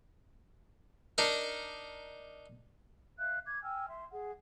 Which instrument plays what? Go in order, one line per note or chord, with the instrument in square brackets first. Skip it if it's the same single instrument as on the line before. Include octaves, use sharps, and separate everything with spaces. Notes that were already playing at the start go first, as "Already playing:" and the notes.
[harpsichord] D4 D#4 A#4
[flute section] E5 F5 F#6
D6 G#6
G5 G#5 E6 F6
E5 C6
G#4 F#5